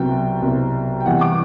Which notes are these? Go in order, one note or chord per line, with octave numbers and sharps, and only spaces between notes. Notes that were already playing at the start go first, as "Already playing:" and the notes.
Already playing: C2 B2 F#3 C4 G5
C2 B2 F#3 C4
G5
E2 C3 E3 G3 F#5
D6